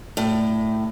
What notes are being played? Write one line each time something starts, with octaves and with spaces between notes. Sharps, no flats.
A2